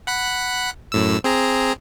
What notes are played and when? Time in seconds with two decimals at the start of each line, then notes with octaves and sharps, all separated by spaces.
0.07 F#5 B5 F#6
0.92 F#2 A2 E6
1.24 C4 G#4 A#5